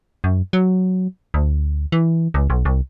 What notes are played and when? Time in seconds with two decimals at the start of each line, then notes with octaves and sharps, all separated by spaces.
0.24 F#2
0.53 F#3
1.34 D2
1.92 E3
2.34 C#2
2.50 B1
2.65 C2